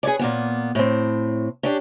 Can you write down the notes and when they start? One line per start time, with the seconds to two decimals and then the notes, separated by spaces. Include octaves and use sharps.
0.03 G#4 B4 C#5 D5
0.19 A#2 A#3 B3
0.75 A2 C4
1.63 C#4 D4 G4